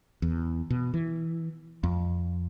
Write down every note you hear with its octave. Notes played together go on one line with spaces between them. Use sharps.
E2
B2
E3
F2